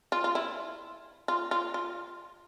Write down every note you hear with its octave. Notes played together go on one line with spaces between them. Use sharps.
F4
F4
E4
F4
F4
F4